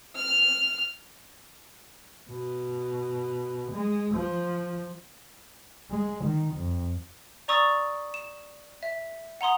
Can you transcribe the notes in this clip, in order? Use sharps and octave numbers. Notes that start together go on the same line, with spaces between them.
F6
B2
G#3
F3
G#3
D#3
F2
D5 A#5 C#6 D#6 E6 A6
E7
E5
F#5 A#5 C6 D#6